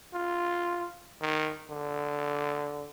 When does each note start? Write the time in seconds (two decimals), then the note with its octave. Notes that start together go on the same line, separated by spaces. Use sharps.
0.14 F4
1.21 D#3
1.70 D3